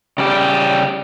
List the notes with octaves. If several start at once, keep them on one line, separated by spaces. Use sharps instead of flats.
C#3 G3 G4